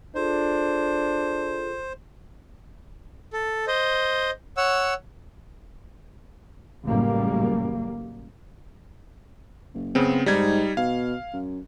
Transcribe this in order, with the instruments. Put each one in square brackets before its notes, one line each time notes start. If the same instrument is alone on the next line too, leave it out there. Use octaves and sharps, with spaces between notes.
[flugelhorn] D4 [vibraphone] F4 G#4 A4 [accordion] C5
[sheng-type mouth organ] A4
C5 D#5
C#5 F#5 E6
[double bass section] A1 F#2 C#3 G3 A#3
[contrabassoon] F#1
[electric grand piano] C#3 B3 C4
[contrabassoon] G#2 [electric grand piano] G3 D#4 G#6
[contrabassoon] B2 [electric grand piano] F5
[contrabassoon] F#2